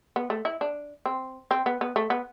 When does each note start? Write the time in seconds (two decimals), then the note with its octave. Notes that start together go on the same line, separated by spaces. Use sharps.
0.16 B3
0.30 A3
0.45 E4
0.61 D4
1.06 C4
1.51 C4
1.66 B3
1.81 B3
1.96 A3
2.10 B3